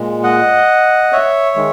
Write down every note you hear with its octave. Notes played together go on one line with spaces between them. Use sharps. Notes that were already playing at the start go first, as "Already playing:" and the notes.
Already playing: A#2 G#3
D#5 F#5
C#5 E5
D#3 G#3